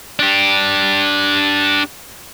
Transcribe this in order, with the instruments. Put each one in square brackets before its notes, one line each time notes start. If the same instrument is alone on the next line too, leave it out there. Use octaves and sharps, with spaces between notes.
[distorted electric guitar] D4 G4